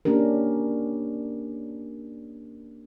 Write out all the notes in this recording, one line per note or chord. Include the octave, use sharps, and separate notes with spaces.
A#3 C#4 D4 G4 A#4